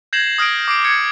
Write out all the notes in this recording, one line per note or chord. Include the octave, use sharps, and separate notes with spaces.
G6 G#6 A#6 C7 E7 F#7
D#6 F6 A#6 D7
D6 C7 D7
G#6 C#7